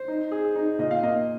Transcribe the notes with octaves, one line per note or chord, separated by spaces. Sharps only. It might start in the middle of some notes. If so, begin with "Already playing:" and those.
Already playing: C5
D#4
G#4
D#4
A#2 D#5
F5
A#3 D#5